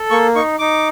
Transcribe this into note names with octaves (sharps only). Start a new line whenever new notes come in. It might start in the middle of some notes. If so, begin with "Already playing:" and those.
Already playing: A4
A#3 C#6
D#4 C#6
D#4 D6